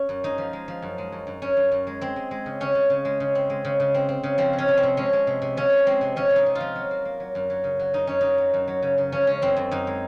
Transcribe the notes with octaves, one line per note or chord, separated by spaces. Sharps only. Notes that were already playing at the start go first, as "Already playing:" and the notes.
Already playing: C#4
F#2
G#3 D#4
F3
G#3
F3
F#2
G#3
F#2
F#2
F#2 C#4
F#2
F#2
G#3
G#3 C4
G#3
G#3
C#3
C#3 C#4
C#3
C#3
G#3
C#3
C4
G#3
C#3
C#3
C4
C4
C#3
F3 C4
G#3
C#4
C3
C4
C3
G#3 C#4
G#3
C3
C3
F3 C#4
G#3
G#3 C4
C3
F3 C#4
C3
D#4
C3
F4
F3
F#3
A#3
A#3
F#3
F#2
F#3
C#3
F#3
F#2 D#4
F#2 C#4
F#3 D#4
F#3
F#2
F#3
C#3
C#3
F3 C#4
G#3 C#4
F#2 C4
F#2
F#2 D#4
G#3